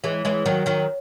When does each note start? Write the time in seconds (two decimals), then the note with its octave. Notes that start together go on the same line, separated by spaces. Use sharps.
0.04 E3 G#3 C#5
0.25 E3 G#3 C#5
0.45 D#3 F#3 C#5
0.66 D#3 F#3 C#5